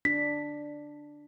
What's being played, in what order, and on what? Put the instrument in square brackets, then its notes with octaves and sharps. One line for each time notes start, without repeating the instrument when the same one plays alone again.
[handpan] D4 [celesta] B6